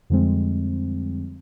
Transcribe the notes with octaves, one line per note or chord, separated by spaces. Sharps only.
F2 D3 F3 G3 G#3 C4